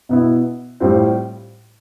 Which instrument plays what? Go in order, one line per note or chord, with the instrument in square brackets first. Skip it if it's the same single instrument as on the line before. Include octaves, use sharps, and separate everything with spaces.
[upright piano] B2 B3 E4
A2 G3 C4 F4